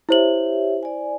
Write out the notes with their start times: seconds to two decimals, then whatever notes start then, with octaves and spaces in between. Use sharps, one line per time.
0.09 E4 G4 C5 C#5 E5 F#7
0.83 D5 G#5